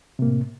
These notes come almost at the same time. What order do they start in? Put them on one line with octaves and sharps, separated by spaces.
C3 A#3 A2